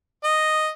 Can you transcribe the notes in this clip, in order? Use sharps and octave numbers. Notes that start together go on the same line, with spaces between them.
D#5